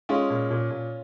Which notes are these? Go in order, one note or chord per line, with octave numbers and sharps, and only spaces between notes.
G#3 C#4 F4
A#2
A#2
A#2